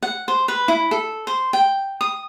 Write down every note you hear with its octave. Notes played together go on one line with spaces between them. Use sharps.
F#5
C5
B4
E4
A4
C5
G5
D#6